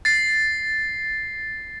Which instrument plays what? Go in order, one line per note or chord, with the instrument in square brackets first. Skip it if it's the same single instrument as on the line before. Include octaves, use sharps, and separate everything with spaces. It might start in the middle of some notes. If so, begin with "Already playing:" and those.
[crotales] A6 C7